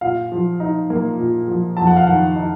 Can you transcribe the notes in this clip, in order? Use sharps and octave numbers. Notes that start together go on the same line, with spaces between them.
A#2 F5
F3
D#4
A#3
A#2
F3
F2 A5
F#5
F5
D#3 F#5
D#4